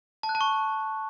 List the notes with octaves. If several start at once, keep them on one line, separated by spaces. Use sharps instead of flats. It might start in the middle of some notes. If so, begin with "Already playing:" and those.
A5
F#6
A5
C#6